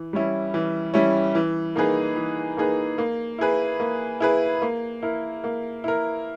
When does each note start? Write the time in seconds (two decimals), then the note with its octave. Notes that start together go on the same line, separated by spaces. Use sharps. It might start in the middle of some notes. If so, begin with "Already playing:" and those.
Already playing: E3
0.13 G3 C#4 E4
0.54 E3
0.94 G3 C#4 E4
1.35 E3
1.76 A#3 D#4 G#4 B4
2.16 E3
2.57 A#3 D#4 G#4 B4
2.98 A#3
3.38 E4 G#4 B4
3.80 A#3
4.20 E4 G#4 B4
4.62 A#3
5.02 E4 A#4
5.44 A#3
5.84 E4 A#4